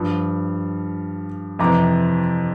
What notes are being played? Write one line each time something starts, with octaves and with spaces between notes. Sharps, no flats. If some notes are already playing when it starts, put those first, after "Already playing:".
Already playing: G2 F3
F2 C3 E3 A#5 D6